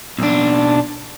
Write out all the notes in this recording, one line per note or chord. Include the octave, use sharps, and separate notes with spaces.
B1 D4